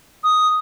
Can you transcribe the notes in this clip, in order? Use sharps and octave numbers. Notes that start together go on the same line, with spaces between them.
D#6